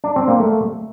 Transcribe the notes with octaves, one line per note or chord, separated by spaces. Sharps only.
D4
C4
A#3
A3